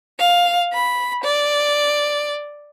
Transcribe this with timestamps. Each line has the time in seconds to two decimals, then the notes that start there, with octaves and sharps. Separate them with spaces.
0.19 F5
0.72 B5
1.22 D5